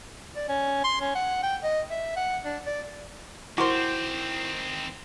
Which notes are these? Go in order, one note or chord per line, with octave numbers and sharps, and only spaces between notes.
D5
C#4
C6
C#4
F#5
G5
D#5
E5
F#5
D4
D5
D#3 C4 E4 F#4 A#4 C5 D6